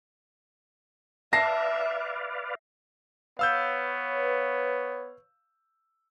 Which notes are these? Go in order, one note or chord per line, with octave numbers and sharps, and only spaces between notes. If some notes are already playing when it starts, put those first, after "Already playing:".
B4 D5 E5 F5 A5 A#6 C7
B3 B4 C#5 F5 E6 G6